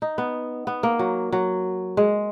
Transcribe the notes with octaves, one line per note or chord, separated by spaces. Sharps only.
D#4
B3
B3
A#3
F#3
F#3
G#3